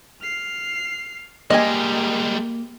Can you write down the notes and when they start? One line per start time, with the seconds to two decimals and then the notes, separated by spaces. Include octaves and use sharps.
0.22 F6 C7
1.50 G3 G#3 A#3 G4 A#4 D#5 G#5